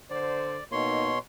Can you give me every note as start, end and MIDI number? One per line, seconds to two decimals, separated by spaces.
0.10 0.57 50
0.10 0.57 72
0.10 0.64 74
0.72 1.19 47
0.72 1.10 58
0.72 1.10 63
0.72 1.19 73
0.72 1.19 84